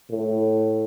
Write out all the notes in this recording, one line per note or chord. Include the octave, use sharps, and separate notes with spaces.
A2